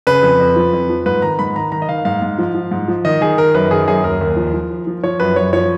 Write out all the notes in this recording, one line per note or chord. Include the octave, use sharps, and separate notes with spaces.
C#3 B4
F2
F2
F3
F2
F3
G#2 B4
D#3 A#5
G#2 B5
D#3 A#5
D#3 A#5
D#5
D#3 F5
G#2 F5
G#2
F3
F3
G#2
F3
D#3 D#5
D#3 G#4
D#3 A#4
F#2 B4
D#3 G#4
F#2 G#4
D#2 A#4
D#2
F3
F3
F3
F3
F3 C#5
F#2 B4
F#2 C#5
F3 C#5